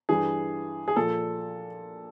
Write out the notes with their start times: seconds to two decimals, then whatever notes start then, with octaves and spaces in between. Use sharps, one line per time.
0.09 G2 E3 G#4
0.88 G#4
0.96 A#2 F3 A4